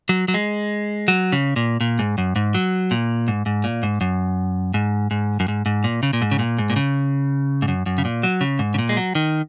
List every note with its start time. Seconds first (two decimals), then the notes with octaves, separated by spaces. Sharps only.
0.09 F#3
0.28 F#3
0.34 G#3
1.08 F#3
1.32 C#3
1.56 A#2
1.81 A#2
1.99 G#2
2.18 F#2
2.36 G#2
2.54 F#3
2.91 A#2
3.28 G#2
3.46 G#2
3.64 A#2
3.83 G#2
4.01 F#2
4.74 G#2
5.11 G#2
5.40 F#2
5.48 G#2
5.66 G#2
5.84 A#2
6.03 C#3
6.13 A#2
6.22 G#2
6.31 C#3
6.39 A#2
6.58 G#2
6.70 A#2
6.76 C#3
7.62 G#2
7.68 F#2
7.86 F#2
7.98 C#3
8.05 A#2
8.23 F#3
8.41 C#3
8.59 G#2
8.74 C#3
8.79 A#2
8.89 G#3
8.97 F#3
9.15 D#3